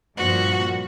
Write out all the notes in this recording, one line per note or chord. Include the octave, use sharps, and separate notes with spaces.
G2 A#2 F3 F#4